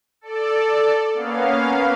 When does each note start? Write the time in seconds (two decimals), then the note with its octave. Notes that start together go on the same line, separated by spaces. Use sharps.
0.21 A4 D5
1.14 A#3 B3 C#4 F5